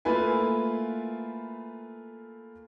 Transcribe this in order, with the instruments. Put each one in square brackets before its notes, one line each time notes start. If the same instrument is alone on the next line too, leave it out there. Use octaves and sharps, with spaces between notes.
[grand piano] A3 A#3 E4 F4 B4 G#5